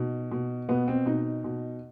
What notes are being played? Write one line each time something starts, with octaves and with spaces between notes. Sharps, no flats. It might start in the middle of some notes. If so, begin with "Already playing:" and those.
Already playing: B2 D#4
B2
B2 B3
C4
B2 D#4
B2